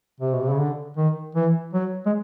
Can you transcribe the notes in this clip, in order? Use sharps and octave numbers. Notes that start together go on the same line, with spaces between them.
C3
B2
C3
C#3
D3
D#3
E3
F#3
G#3